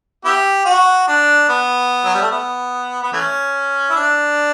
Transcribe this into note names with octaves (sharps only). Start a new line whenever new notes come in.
B3 E4 G4
F#4
D4
B3
F#3
G3
A3
B3
B3
E3 A3 C#4
E4
D4